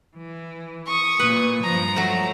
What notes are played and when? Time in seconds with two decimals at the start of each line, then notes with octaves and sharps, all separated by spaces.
0.16 E3
0.86 C#6 D#6
1.19 A#2 B4
1.63 G2 F3 A#5
1.96 F#3 A3